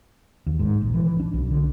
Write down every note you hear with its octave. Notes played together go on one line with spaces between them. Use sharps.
D#2
G#2
A#1
E3
E3
D4
B1
D3